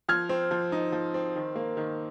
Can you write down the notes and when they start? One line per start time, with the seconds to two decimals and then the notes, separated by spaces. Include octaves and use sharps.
0.08 F3 F6 G#6
0.29 C4
0.51 F3
0.72 D#4
0.92 F3
1.14 C4
1.36 D#3
1.56 A#3
1.77 D#3